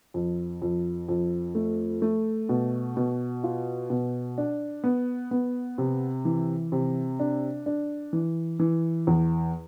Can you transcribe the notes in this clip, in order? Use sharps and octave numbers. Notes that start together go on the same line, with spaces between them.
F2
F2
F2
A3
A3
B2
B2
F4
B2
D4
B3
B3
C3
E3
C3
D4
D4
E3
E3
E2